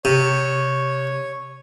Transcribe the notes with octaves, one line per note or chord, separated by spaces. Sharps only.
C3 C#5